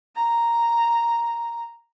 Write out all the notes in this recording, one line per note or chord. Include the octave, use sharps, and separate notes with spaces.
A#5